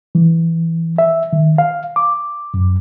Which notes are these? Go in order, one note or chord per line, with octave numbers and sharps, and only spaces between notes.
E3
E5
D#3
F5
D6
F#2